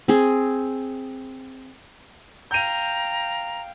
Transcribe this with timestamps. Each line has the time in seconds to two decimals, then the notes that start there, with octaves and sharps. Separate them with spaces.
0.08 C4 G#4
2.51 F5 G5 A#5 G6 D#7